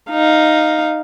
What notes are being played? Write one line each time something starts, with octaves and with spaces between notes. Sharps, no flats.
D#4 F5